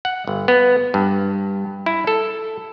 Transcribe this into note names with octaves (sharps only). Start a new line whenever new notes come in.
F#5
G1
B3
G2
E4
A4